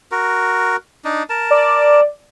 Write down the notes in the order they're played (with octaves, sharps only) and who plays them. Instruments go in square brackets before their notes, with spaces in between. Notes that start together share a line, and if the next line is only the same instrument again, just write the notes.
[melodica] F#4 A#4
D4 D#4
A#4 A5
[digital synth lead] D5